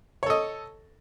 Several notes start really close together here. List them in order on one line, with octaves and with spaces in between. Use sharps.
C#5 A4 D#5